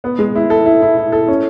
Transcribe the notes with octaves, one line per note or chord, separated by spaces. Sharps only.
B3
G#3
E4
A4
E4
E4
E4
A4
C#4